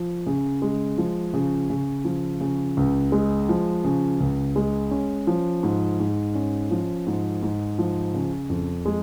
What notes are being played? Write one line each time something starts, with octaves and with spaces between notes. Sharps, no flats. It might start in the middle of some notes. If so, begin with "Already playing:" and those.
Already playing: F3
C#3
G#3
F3
C#3
C#3
F3
C#3
C#2
G#3
F3
C#3
C#2
G#3
C#4
F3
G#2
G#2
C#4
F3
G#2
G#2
F3
C#3
F2
G#3